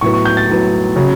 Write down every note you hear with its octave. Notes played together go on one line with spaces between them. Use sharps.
A2 F#3 B3 C#6
C#6
G6
A6
A2 F#3 B3
C#3 F#3 C#4